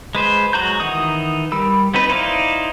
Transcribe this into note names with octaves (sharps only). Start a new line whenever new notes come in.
G#3 B4 C5
F#3 G#3 F#4 A#5 G6
D#3 E3 D#4 F#5 D#6
G3 A#4 B5 E6
B3 C4 D#4 B4
D#4 E4 C5 D5 F5